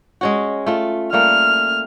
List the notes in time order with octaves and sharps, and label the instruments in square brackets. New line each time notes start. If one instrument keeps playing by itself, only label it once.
[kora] G#3 C#4 F#4
A3 F4
[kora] G3 A3 A#3 [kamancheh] F6